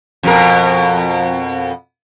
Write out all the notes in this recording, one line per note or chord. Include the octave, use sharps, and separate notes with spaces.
F2 B2 A#4